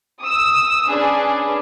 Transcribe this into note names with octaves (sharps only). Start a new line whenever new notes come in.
D#6 E6
C#4 D4 G#4 B4